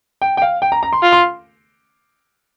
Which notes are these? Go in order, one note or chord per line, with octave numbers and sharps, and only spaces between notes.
G5
G5
F5
G5
A#5
A#5
C6
F4
C6